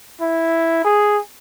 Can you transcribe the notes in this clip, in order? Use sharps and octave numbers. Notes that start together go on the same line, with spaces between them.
E4
G#4